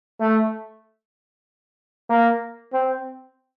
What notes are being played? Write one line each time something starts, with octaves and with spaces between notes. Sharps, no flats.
A3
A#3
C4